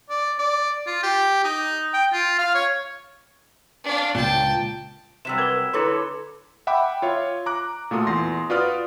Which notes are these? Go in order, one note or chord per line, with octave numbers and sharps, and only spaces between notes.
D5
D5
F4
G4
D#4
G5
F4
F5
C#5
D4 F5
C#2 A#2 G5 A5
C3 F#3 G3 E6 B6 E7
A#4 B4 D6 G#6 G7
D3 E4 A4 B4 C#5 C6 D6 C#7
E5 F#5 G5 B5 D6
F4 C#5 E5
A#5 D6 F#6
A#2 A3 F4 F#4 A4 D#6
E2 C6 A#6
F4 F#4 B4 D5 D#6 F6